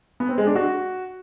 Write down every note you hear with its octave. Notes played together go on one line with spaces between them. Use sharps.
B3
C4
G#3
D4
F#4